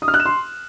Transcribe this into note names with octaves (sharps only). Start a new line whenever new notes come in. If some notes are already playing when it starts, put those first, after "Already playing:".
D#6
F6
F#6
E7
C6